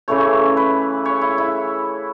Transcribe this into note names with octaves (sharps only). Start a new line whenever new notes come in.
C#3 E3 A3 C#5
B4
C#5
E4
E4